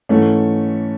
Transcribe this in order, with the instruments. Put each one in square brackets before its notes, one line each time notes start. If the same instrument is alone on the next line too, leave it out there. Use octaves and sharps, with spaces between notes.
[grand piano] G#2 E3 A3 C#4